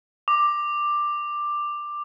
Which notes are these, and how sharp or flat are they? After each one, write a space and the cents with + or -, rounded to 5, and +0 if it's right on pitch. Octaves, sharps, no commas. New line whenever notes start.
D6 +10